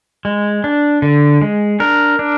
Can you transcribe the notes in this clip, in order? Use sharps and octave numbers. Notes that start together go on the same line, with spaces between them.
G#3
D4
D3
G#3
D4 A#4
D4